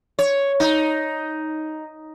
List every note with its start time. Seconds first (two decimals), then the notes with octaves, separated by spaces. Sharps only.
0.19 C#5
0.60 D#4